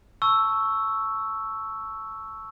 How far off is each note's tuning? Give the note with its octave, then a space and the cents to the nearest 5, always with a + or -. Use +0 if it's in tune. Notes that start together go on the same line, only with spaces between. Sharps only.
A5 +0 C#6 +0 E6 +0